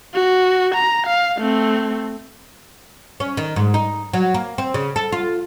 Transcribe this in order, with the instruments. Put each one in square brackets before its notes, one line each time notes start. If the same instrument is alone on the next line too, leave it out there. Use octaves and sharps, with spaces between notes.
[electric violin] F#4
A#5
F5
A3 C4
[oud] C#4
D#3
G#2
D#4
F#3
A#3
C4
C#3
A4
F4